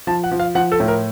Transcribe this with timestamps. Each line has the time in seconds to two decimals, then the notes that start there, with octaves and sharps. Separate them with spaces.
0.07 F3 A5
0.24 F#5
0.31 F3
0.40 F5
0.55 F3 F#5
0.72 A4
0.80 A2
0.88 A#4